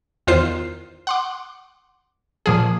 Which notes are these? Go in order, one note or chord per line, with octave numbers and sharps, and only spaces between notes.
E2 D#3 F4 C5 F#6 C7
F#5 C6 D6
A#2 F3 G#4